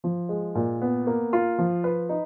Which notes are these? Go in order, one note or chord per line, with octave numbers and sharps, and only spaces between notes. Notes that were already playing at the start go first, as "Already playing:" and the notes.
F3
G#3
A#2
B3
A#3
F4
F3
B4
D#4